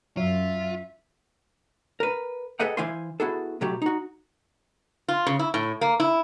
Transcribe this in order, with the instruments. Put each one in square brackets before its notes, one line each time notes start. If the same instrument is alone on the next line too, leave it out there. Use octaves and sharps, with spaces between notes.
[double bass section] F#2 [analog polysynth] F#3 [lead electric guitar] F4 [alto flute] E5
[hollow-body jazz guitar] A#4 B4
G#4 A4 B4 D#5 F#5 G5
E3 E4 C5 F5 G#5 C6
B3 E4 F#4 G#4 A4
B2 F#3 A3 G4
D#4 F#4
[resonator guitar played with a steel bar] F4
C#3
E4
A2
A#3
E4